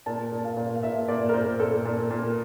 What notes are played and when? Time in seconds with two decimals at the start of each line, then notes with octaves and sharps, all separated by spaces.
0.06 A#2 A5
0.32 A#2
0.45 F5
0.57 A#2
0.76 F5
0.83 A#2 E5
1.08 A#2 D5
1.29 A#4
1.34 A#2 C5
1.60 A#2 A4
1.85 A#2
2.10 A#2